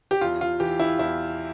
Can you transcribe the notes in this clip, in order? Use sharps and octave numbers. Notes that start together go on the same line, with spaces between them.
G4
E2 F4
F4
E3 G4
E4
E2 E4